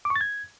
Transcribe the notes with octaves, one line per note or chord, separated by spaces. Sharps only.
D6
C#6
A6
G#6